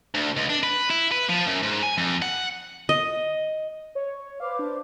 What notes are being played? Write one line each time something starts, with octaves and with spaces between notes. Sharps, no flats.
D2
C#2
D4
B4
E4
B4
F3
F#2
G#2
G#5
F2
F#5
D#5
C#5
B4 C5 F5 D6
D4